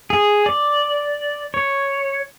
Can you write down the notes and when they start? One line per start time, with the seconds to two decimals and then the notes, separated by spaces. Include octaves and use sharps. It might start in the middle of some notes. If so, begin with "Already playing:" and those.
0.10 G#4
0.46 D5
1.54 C#5